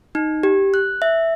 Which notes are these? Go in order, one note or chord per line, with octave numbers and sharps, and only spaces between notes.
D#4
G4
F#6
E5